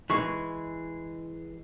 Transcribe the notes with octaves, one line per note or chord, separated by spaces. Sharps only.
E3 G#3 C#6